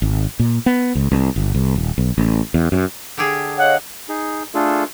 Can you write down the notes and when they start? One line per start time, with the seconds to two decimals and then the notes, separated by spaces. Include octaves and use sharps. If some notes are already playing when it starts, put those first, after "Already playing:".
0.02 G#1
0.39 A#2
0.66 B3
0.95 C#2
1.12 C2
1.36 G1
1.54 C2
1.76 D#1
1.98 B1
2.18 A1
2.54 E2
2.72 F#2
3.18 D3 G4 G#4
3.58 C#5 D#5 F5 F#5
4.09 D#4 G#4
4.54 A3 D4 F4 G#4 A4